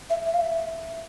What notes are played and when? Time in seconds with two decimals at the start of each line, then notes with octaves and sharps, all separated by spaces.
0.10 E5
0.26 E5
0.34 F5
0.41 E5